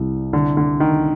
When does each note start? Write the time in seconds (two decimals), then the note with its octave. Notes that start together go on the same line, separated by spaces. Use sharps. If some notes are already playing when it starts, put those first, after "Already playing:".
Already playing: C2 G3
0.33 D3
0.57 D3
0.80 D#3